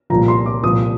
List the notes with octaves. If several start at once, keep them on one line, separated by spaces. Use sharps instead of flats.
C2 A#2 F3 A#5
C6
D6
C2 A#2 F3 D#6